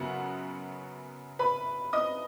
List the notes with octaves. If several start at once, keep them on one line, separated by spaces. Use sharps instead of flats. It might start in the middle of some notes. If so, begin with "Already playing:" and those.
Already playing: F#2 C#3 B3 F#4 F#5
B4 B5
D#5 D#6